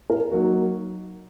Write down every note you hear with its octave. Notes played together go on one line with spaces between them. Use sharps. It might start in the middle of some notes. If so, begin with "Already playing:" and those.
A#4
F#3 A#3 D#4 F#4